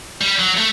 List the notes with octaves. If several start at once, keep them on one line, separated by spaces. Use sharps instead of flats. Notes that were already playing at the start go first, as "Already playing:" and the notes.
G3
F#3
A3